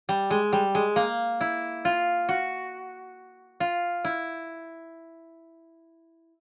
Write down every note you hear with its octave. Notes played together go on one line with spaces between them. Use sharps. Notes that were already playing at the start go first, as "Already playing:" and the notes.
G3
G#3
G3
G#3
A#3
E4
F4
F#4
F4
E4